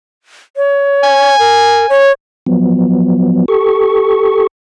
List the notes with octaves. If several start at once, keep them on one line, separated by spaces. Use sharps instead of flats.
C#5
G#5
A#4
C#5
F3 F#3 B3
G4 A4 C#6